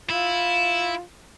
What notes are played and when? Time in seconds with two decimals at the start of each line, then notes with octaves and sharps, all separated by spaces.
0.09 E4 F4